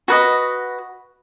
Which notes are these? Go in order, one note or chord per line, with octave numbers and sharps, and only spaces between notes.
F#4 B4 D#5